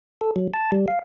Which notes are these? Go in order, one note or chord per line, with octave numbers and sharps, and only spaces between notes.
A4
F#3
A5
G3
F5